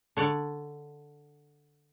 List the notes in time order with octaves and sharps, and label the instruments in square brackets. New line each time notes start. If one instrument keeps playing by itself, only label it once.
[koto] D3 C#5 D5